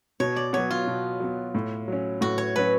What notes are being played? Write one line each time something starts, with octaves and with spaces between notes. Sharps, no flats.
B2 C#5
D5
F#3 B3 C#5
F4
B2
F#3 B3
A2
F#3 C#4
A2 F#4
C#5
F#3 C#4 B4